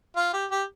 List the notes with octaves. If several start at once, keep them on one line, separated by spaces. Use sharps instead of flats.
F4
G4
G4